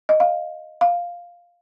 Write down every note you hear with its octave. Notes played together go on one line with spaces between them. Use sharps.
D#5
F5
F5